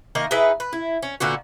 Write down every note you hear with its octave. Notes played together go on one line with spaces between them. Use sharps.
D#3 A#3 D#5
D#4 E4 G#4 B4
B4
E4
C#4
A#2 D3 B3 F#4